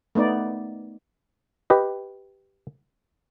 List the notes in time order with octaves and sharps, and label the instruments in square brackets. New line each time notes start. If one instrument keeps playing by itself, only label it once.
[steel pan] A3 B3 D#4 D5
[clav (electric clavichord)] G4 B4 D#5